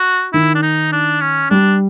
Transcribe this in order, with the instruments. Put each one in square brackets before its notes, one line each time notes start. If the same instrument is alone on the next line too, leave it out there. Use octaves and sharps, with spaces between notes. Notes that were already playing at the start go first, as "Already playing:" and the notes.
Already playing: [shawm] F#4
[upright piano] D#3 [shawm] E4
[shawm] D4
D#4
D4
C#4
[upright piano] G3 [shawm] D4